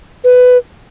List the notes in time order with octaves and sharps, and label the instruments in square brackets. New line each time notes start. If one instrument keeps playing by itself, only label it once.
[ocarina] B4